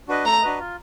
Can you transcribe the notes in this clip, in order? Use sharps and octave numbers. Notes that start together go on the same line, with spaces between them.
D4 F#4 B4 D#5
A3 A#5
D4 F#4 B4 D#5
F4